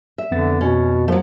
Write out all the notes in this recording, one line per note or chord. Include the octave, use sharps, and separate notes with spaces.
E5
F2 D3 B3 A6
B2 C#4
F3 F#3 A3